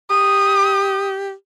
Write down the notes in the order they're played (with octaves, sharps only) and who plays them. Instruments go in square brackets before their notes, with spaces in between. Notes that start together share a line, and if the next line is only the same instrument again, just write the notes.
[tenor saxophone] G4 [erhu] D#6